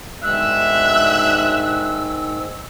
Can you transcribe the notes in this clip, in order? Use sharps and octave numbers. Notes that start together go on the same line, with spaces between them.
G#2 B2 D3 D#3 G#3 E5 E6 F#6